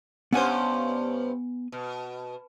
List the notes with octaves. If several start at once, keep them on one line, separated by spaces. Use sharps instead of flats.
G2 B3 C#4 C5 F#5 G#5
B2